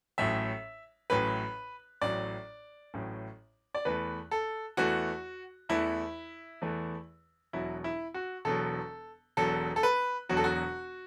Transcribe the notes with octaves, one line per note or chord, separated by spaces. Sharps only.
A1 A2 F#3 E5
A1 A2 F#3 B4
A1 A2 F#3 D5
A1 A2 F#3
D5
E2 E3 A3 B4
A4
E2 E3 A3 F#4
E2 E3 A3 E4
E2 E3 A3
E1 E2 B2 F#3 E4
E4
F#4
E1 E2 B2 F#3 A4
E1 E2 B2 F#3 A4
A4
B4
E1 E2 B2 F#3 F#4
A4
F#4